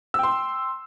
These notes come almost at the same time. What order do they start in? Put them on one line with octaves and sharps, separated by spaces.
E6 G5 C6